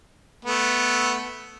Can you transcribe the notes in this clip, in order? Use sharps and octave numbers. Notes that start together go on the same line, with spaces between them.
A3 B3